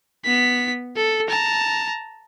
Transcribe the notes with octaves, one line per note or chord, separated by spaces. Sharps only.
B3 B6
A4
A5 A#5